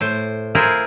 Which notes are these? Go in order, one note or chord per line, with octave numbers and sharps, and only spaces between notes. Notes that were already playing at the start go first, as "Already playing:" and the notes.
A2 C5
E4 F4 G#4 A#4 C5